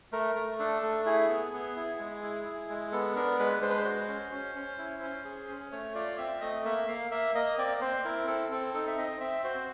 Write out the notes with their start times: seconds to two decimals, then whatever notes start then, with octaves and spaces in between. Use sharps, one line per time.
0.12 A3 A#4
0.35 A3
0.59 D4 A4
0.83 A3
1.06 E4 G#4
1.29 B3
1.53 B3
1.76 E4
1.99 G#3
2.22 E4
2.45 E4
2.69 G#3
2.92 B3 A4
3.16 D4 A#4
3.39 G#3 B4
3.62 G#3 C5
3.70 B4
3.78 C5
3.85 F#4
4.08 C#4
4.32 C#4
4.55 C#4
4.78 E4
5.02 C#4
5.24 G#4
5.48 C#4
5.71 A3 C#5
5.95 F4 D5
6.18 C4 E5
6.41 A3 D#5
6.65 A#3 E5
6.88 A#3 F5
7.11 A#3 E5
7.35 A#3 D#5
7.58 C4 D5
7.81 C4 C5
8.05 E4 A#4
8.27 C4 A4
8.52 C4 A4
8.74 D#4 A4
8.88 E5
8.98 C4 D#5
9.20 C4 E5
9.44 F#4 C5